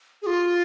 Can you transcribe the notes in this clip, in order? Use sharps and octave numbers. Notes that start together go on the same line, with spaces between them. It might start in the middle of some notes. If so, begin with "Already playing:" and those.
G#4
F4